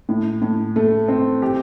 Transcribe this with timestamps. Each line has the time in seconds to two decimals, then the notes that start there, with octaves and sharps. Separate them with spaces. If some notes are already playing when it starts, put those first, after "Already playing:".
0.09 A2
0.42 A2
0.76 A3
1.08 C4
1.42 G4